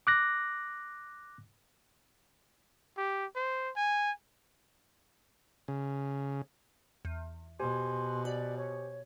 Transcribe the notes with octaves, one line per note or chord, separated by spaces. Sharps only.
D6 F#6 A#6
G4
C5
G#5
C#3
E2
B2 G4 C5 G#5 C6
F#4 D5
C#5